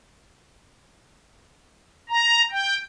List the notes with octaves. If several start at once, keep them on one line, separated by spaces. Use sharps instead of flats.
A#5
G5